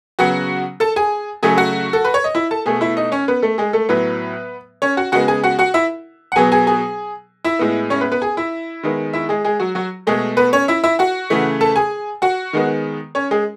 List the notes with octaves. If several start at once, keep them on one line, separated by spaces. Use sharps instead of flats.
C#3 F#3 B3 F#4 F#5
A4 A5
G#4 G#5
C#3 F#3 A3 G#4 G#5
F#4 F#5
A4
B4
C#5
D#5
E4 E5
A4 A5
B2 A3 G#4 G#5
E4 E5
D#4 D#5
C#4 C#5
B3 B4
A3 A4
G#3 G#4
A3 A4
A2 F#3 B3 B4
C#4 C#5
F#4 F#5
C#3 G#3 B3 F#4 F#5
G#4 G#5
F#4 F#5
F#4 F#5
E4 E5
F#5
B2 F#3 B3 G#4 G#5
G#4 G#5
G#4 G#5
E4 E5
A2 G#3 B3
C#4 C#5
B3 B4
B3 B4
G#4 G#5
E4 E5
D#3 G#3 B3
E4 E5
G#3 G#4
G#3 G#4
F#3 F#4
F#3 F#4
B2 G#3 A3 G#4
B3 B4
C#4 C#5
E4 E5
E4 E5
F#4 F#5
C#3 E3 A3
A4 A5
G#4 G#5
F#4 F#5
D#3 G#3 B3
C#4 C#5
G#3 G#4